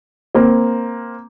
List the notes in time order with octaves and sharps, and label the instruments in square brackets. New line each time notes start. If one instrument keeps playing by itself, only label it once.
[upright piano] A#3 C4